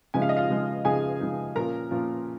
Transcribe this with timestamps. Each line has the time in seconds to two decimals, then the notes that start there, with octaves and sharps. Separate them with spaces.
0.14 C#3 F3 G#3 D#4 G#5
0.22 F5
0.29 D#5
0.36 F4 F5
0.50 C#3 F3 G#3 D#4
0.85 C#3 F3 G#3 D#4 G#4 G#5
1.20 C#3 F3 G#3 D#4
1.56 A#2 F3 C#4 F4 A#4 A#5
1.91 A#2 F3 C#4 F4